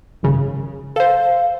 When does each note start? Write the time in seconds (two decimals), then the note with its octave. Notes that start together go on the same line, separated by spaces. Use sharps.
0.23 G#1 F#2 C#3
0.96 A4 C5 F5